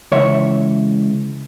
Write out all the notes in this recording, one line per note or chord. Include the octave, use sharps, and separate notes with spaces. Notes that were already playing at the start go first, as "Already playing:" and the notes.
C#2 C#3 E3 C#5 E5